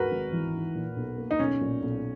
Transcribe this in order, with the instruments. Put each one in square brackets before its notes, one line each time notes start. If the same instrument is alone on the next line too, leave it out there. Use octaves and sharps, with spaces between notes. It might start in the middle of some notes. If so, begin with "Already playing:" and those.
Already playing: [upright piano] G#2 [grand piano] F#4 A#4 B4
[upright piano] G#1
E3
D#4
A#2
B1
A#3
[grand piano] D#4
[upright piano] B1 [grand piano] C#4
[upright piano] A#2
B1